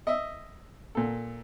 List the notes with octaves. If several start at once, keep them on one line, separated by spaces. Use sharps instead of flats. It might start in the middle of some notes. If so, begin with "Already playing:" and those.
D#5 E5
A#2 A4